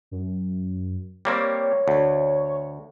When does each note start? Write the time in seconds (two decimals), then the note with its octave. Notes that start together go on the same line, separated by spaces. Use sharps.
0.11 F#2
1.25 G3 A#3 C4 C#5
1.88 D2